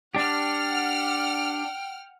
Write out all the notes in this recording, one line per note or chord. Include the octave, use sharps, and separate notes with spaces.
D4 G4 F#5 G5 F6